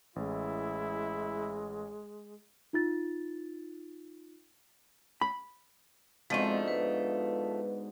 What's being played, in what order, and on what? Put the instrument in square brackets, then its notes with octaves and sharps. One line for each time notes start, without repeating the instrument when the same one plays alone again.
[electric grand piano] A1 [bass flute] G#3 [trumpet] E4
[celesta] D#4 F4 A6
[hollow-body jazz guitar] B5
[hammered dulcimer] G#2 B2 D3 [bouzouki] F3 A3 [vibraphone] G#3 C4
[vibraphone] B4